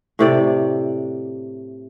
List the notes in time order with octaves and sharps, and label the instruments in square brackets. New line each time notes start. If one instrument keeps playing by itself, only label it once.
[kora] A2 C3 D5